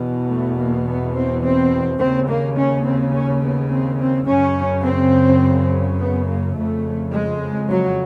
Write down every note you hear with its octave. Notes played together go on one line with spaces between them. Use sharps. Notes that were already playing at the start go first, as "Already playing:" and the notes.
Already playing: E2 B2
A3
A#3
B3
C4
C4
D#2 C#3 C4
A#3
C#4
C4
C#4
B3
C4
C4
F#2 C#3 C#4
C4
B3
A#3
F2 C#3 A3
G#3
F#3